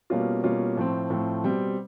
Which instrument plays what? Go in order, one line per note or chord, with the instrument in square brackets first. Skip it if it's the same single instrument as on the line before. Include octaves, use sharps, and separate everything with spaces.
[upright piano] B2 G3 A#3 C#4 F4
B2 G3 A#3 C#4 F4
A2 F3 A3 C4
A2 F3 A3 C4
B2 G3 C4